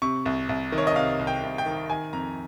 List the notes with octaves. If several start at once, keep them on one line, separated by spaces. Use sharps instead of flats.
C3 C#6
C2
C2
D#3
C#5
D#5
C3 F5
C2
G5
C2
G5
D#3
D#3 G#5
F2 A#5